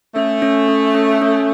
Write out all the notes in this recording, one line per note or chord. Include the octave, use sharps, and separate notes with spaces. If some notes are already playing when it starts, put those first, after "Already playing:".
A3 C#4
C#4
C#4
C#4
C#4